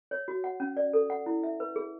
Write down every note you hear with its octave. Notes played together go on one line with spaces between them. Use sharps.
C#5
F#4
F#5
C#4
D5
A4
F#5
E4
E5
B4
G#4